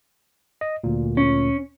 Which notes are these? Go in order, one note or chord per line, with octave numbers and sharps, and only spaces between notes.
D#5
D2 A#2
C#4